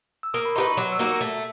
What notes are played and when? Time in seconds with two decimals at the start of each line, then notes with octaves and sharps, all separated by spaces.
0.23 E6
0.34 A#3 D#6
0.45 B5
0.56 D#4 G4 B4 C6
0.67 C#6
0.77 F#3 D6
0.92 E6
0.99 A#3 D#4 F#4
1.06 E6
1.21 A3